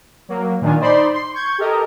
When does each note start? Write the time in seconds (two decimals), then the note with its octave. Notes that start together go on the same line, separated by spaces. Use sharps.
0.29 F#3 A#3
0.61 A#2 D#3 D4 F4 G#5
0.80 D#4 C5 D5 B5 C6
1.14 C6
1.33 C#6 G6 G#6
1.58 G4 A4 A#4 D#5